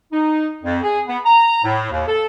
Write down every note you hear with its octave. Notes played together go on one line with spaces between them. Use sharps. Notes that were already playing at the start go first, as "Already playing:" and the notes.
D#4
F2
G#4
B3
A#5
A2
D#2
A4